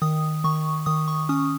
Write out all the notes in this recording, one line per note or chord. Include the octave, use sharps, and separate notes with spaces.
D#3 D#6
D#3 C#6
D#3 D#6
C#6
C#4 D#6